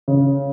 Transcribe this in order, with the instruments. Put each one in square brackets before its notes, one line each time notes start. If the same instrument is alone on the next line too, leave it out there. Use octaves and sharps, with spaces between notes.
[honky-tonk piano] C#3